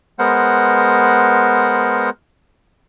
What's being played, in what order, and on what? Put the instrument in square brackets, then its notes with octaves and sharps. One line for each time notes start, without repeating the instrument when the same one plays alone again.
[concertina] G#3 B3 A#4 C5 F#5